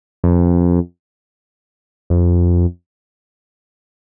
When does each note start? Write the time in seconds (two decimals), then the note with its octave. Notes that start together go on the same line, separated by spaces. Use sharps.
0.24 F2
2.10 F2